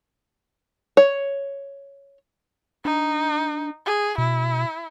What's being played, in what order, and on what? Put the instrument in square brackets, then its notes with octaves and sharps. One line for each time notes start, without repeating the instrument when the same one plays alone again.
[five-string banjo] C#5
[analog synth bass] D4 [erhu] D#4
[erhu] G#4
[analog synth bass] B2 [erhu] E4